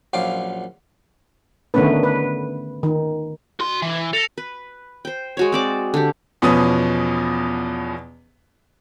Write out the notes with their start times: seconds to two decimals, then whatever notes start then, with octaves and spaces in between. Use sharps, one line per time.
0.13 A#1 F#2 F4 D6
1.74 D3 D#3 A3 B3 C#4 B4
2.03 B4
2.83 D#3
3.60 F#4 C6
3.82 E3
4.13 A4 A#6 C#7 F7
4.38 B4
5.05 C5 G5
5.37 G#3 F#4 C#5
5.52 C4 D5 D6
5.94 D3 G4
6.42 E2 B2 F3 C#4 B4 D#6